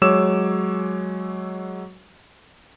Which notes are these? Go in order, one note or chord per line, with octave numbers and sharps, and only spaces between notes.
F#3 G#3 C#5 D6 E6 E7